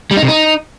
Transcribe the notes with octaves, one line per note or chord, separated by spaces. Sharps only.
G3
D#4
C3
D#4